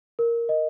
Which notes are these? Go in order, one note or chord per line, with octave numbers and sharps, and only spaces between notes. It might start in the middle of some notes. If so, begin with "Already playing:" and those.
A#4
D#5